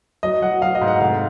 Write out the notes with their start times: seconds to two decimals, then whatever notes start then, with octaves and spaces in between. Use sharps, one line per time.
0.23 F#3 D#5
0.42 F#3 F#5
0.62 F#3 F5
0.75 D#5
0.81 G#2
0.88 F#5
1.00 F1 F5